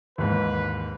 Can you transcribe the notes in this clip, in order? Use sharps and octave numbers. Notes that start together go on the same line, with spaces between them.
D#2 G#2 E3 B4